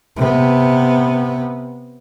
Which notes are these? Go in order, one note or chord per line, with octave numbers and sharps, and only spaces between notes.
C3 B3